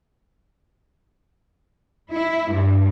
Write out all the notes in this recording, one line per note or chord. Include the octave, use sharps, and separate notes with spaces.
E4
G2